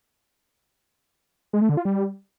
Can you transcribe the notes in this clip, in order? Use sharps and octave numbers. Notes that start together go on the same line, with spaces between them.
G#3
A3
D3
F4
G3